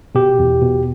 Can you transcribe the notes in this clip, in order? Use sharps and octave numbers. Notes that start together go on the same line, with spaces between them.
B2 G4
E2
B2